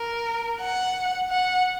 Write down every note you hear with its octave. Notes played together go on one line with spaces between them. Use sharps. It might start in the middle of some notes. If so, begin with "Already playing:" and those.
Already playing: A#4
F#5
F#5